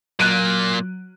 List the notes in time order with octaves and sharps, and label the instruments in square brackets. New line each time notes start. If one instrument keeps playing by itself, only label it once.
[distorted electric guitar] A#2 A#3 [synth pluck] F#3 [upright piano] F#6 D7 D#7